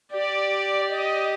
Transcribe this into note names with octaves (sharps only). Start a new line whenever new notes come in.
G4 D5
D#5